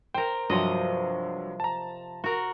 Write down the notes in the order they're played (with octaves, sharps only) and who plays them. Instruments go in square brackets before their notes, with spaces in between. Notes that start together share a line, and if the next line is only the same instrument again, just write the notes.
[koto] A#4 C5 [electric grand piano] G5
[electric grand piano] G2 F#3 [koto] C3 F3 D#5
[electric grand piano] A5 A#5
[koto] F#4 A#4